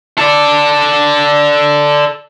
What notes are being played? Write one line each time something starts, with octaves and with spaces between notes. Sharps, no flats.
A4 D5